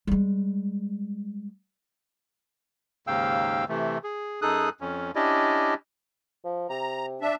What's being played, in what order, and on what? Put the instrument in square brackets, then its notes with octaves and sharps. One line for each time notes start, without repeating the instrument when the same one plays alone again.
[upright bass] G3 G#3
[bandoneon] D#2 G#2 C#3 F5 G5 E6
C3 E3 A3
G#4
F#2 D#4 G#4 A4 D#6 F#6
F2 C#4
C#4 D4 E4 G4 D5 D#5
[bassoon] F3
[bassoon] C3 [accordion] A#5
[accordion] D4 E5